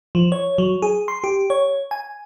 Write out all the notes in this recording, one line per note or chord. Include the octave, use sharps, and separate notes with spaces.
F3
C#5
F#3
G#4
C6
G4
C#5
G#5